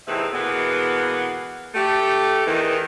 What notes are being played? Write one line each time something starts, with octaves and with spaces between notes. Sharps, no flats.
E2 A2 C3 D#4 B4 E5
B2 E3 G#3 A#3 B3
A3 G4
E2 D#3 E3